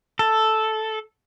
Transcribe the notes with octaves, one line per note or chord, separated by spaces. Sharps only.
A4